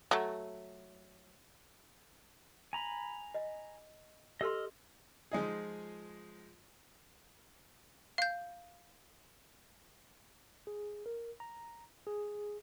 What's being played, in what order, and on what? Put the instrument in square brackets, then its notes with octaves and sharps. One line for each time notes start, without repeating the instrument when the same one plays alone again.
[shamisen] F#3 A3
[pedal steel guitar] G#5 A#5 B5
[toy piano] D#5
[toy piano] G4 A4 C6 [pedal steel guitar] D#5 E6 F6
[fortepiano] F3 G#3 D#4 G#4
[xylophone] F5 G6
[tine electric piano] G#4
A#4
A#5
G#4